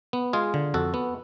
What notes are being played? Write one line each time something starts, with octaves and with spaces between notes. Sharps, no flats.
B3
G#3 F4 G#4
D3
F2 F#4 A4
B3